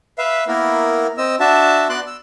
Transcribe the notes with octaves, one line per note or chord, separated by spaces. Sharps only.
B4 E5 F5
A#3 B3 E4 A#4
C4 D#5 E6
D4 F#4 E5 A5
B3 F#4 D5 C6 F#6
E6